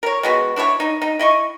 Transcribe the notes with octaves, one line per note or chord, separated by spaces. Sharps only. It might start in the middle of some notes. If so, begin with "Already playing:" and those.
A#4 C#5
G#3 B3 F#4
D4 E4 C5 C#5
D#4
D#4
E4 D#5 C#6